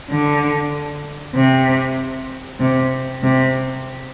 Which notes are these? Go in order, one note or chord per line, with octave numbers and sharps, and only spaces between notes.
D3
C3
C3
C3